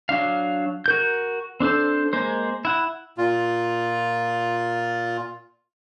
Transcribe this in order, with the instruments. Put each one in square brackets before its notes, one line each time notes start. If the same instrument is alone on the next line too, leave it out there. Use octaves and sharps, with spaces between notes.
[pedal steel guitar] F#3 D4 F5
F#4 A#4 G6
C4 D4 A4 C5
G#3 A#3 C5
E4 F#5
[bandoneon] A#2 F4